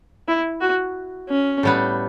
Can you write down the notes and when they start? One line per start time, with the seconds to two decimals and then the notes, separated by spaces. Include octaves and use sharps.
0.28 E4
0.61 F#4
1.29 C#4
1.63 A2 G3 B3